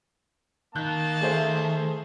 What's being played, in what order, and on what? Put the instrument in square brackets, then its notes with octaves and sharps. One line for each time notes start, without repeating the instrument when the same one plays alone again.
[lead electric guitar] D#3 [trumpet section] A#3 A5 [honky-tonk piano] F#6 G6
[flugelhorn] A3 [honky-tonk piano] G#4 C5 E5